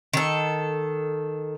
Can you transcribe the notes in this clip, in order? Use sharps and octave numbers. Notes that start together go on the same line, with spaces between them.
D#3 A4